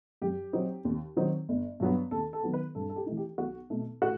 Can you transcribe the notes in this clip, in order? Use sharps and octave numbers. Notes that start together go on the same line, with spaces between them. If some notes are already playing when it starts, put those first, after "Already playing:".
F#2 G4
F#3 C4 D#4
D#2
D#3 F#3 C4 D#4
G1
G2 F#3 B3
D#2 A4
A4
D#3 F#3 B3
B4
G2 A4
A4
G4
E3 A3 D#4
G4
B1 F#4
B2 A3 D#4
A2 F#4